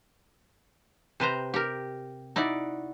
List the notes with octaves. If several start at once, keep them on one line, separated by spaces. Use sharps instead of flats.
C3 B4 C5 A#5
G4 A#4
D#4 E4 F#4 D5